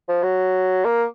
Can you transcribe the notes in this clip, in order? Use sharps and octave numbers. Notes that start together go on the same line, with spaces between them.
F3
F#3
A#3